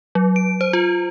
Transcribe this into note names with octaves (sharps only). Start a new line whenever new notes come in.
F#3
D7
C5
F4